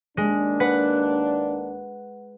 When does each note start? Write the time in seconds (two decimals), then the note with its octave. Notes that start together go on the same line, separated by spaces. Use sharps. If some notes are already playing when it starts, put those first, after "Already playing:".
0.17 D#2 G#3 A#3 D4
0.60 B4 F#5